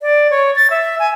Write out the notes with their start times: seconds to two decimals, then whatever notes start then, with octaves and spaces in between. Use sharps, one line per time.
0.02 D5
0.31 C#5
0.56 A6
0.70 E5
0.99 G#5